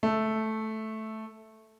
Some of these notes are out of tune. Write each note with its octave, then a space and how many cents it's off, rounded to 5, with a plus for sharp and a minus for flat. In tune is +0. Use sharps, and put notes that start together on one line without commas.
A3 -5